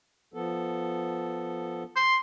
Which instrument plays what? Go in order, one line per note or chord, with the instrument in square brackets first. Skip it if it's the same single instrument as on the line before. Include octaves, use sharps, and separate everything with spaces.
[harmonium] F3 B3 A4
[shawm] C6